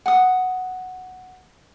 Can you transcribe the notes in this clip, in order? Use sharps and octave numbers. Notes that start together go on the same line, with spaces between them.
F#5 D#6